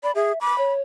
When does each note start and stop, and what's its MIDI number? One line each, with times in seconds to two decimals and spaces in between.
0.03 0.11 74
0.03 0.12 83
0.15 0.32 68
0.15 0.41 76
0.41 0.73 83
0.41 0.56 86
0.58 0.81 73